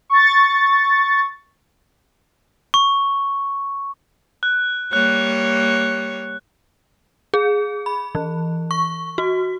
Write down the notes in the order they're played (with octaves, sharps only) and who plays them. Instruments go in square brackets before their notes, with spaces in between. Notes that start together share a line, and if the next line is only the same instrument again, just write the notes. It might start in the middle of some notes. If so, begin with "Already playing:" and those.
[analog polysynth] C#6 A6
[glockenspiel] C#6
[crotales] F#6
[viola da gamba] G3 A#3 C#5 [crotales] F#6
[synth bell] G#4
B5
E3
C#6
F#4